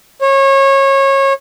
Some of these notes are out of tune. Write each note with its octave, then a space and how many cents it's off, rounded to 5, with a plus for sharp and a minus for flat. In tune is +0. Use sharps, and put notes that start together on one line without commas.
C#5 -25